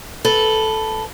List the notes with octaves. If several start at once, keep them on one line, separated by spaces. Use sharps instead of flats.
A4 B4